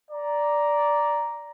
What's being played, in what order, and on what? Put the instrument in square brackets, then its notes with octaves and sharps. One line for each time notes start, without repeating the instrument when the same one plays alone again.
[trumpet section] D5 A#5